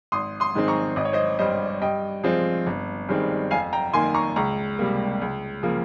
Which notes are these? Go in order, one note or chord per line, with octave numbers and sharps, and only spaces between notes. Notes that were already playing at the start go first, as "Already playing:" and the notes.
G#1 C6 D#6
C6 D#6
G#2 D#3 G#3 C4
A#5 C#6
G#1 D#5
C#5
C5 D#5
G2 G3 C5 D#5
G2 D#5 G5
F3 G#3 C4
G1
G2 D#3 G#3 C4
F2 F5 G#5
G5 A#5
D#3 A#3 G#5 C6
A#5 C#6
C#2 A#5 C#6
C3 G3 A#3
C#2
C#3 F3 A#3